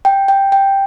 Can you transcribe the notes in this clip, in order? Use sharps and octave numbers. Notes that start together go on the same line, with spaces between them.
G5
G5
G5